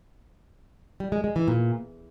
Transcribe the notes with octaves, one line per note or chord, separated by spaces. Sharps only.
G3
G#3
G#3
E3
A#2